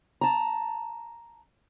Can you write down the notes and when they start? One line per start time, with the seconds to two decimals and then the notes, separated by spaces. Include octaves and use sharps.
0.21 A5 A#5